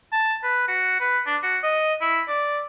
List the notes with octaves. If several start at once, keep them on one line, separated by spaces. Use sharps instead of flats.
A5
B4
F#4
B4
D4
F#4
D#5
E4
D5